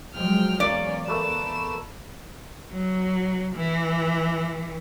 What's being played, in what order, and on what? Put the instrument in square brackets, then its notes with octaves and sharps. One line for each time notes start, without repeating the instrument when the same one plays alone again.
[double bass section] F3 F#3 G#3 [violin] G5 F6
[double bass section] E2 [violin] A#3 C#4 [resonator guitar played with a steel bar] D5
[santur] A3 A#3 B4 [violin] E7
[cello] F#3
E3